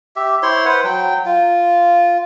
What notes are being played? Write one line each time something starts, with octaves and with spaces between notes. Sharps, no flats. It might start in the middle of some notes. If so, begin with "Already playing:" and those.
G4 E5
E4 C5 C#5 C6
B4 C5 F#5
F#3 G5
F4